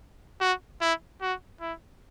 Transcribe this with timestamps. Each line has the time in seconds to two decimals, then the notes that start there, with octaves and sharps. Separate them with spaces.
0.41 F#4
0.81 E4
1.22 F#4
1.61 E4